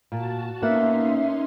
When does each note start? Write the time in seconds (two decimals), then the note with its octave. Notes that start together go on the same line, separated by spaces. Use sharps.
0.12 A#2 F#4 A5
0.63 A#3 B3 C#4 D#4 E5 F#5 C6